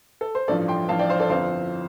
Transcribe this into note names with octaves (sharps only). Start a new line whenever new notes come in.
A4
C5
A1 G2 F3 A4 D5
G5 C6
A1 G2 F3 F5 A5
D5 G5
C5 F5
A4 D5
G1 F2 F3 C4 C5 F5